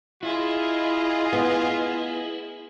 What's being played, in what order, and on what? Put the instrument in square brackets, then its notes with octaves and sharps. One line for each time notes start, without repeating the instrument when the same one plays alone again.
[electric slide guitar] E4 [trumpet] F4 [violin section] G#4 D#5
[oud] B3